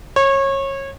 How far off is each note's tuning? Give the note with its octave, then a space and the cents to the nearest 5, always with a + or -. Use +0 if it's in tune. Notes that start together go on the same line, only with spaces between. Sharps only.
C#5 -25